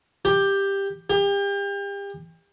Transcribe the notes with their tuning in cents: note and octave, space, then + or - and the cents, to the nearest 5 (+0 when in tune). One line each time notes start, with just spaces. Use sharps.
G4 +10
G4 +35